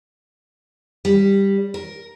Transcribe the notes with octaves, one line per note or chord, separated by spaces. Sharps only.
G3
A#4